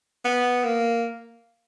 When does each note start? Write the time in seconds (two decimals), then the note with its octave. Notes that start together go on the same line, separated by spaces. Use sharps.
0.25 B3
0.64 A#3